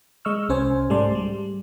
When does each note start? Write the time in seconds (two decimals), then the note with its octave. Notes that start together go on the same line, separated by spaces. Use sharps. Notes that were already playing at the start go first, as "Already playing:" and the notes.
0.25 G#3 D#5 C#6 E6 F6
0.49 C2 C#4 C5 G#5
0.90 G#2 G3 A3 D5 A5 C6
1.12 G3 G#3